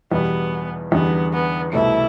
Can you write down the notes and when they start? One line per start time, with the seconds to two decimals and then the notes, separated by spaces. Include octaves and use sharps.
0.11 E2 B2 G3 B3
0.92 E2 D3 G3 B3
1.33 B3
1.73 C2 B2 A3 E4